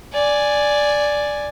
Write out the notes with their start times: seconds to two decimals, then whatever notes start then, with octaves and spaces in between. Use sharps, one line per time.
0.13 D5 G#5